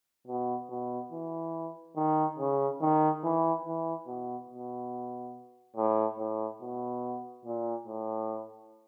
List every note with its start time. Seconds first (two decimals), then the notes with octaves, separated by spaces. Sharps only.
0.27 B2
0.70 B2
1.12 E3
1.96 D#3
2.38 C#3
2.81 D#3
3.23 E3
3.65 E3
4.07 B2
4.50 B2
5.77 A2
6.18 A2
6.61 B2
7.45 A#2
7.87 A2